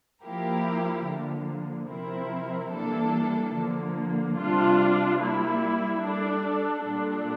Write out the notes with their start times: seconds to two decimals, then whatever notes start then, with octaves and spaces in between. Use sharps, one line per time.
0.23 F3 A#3 E4 G4 A#4
1.06 D3 F3 A#3
1.89 C3 F3 C4 E4 A#4
2.73 E3 G3 A#3 D4 A4
3.54 D3 F3 A#3
4.38 C3 G3 D4 F4
5.21 G3 A#3 E4
6.04 G3 D4 A4
6.86 A#2 G3 D4 A4